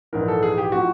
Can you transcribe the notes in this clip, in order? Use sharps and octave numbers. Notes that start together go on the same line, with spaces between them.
A#1 G#2 E3 A#4
A4
G#4
G4
A2 F3 F#4